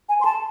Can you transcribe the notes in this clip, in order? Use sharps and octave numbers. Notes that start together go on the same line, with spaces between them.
G#5
C6
A5